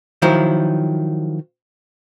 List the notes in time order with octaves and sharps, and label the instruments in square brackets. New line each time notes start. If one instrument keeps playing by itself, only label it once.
[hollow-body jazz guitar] D#3 F3 F#3 E4